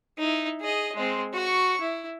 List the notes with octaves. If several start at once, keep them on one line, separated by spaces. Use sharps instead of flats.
D#4 E4
G#4 D#5
G#3 C4
F#4 C#6
E4